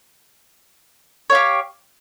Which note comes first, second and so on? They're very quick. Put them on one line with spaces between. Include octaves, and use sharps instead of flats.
C#5 F5 G4